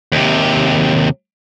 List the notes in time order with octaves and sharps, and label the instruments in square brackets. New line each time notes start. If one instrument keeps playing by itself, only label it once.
[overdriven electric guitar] D#2 C3